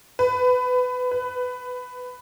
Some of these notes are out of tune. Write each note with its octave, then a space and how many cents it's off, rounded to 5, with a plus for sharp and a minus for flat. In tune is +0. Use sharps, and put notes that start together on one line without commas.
B4 +20
B4 +15